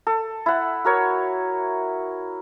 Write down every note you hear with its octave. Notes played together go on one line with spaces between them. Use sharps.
A4
E4 F#5
F#4 A#4 C#5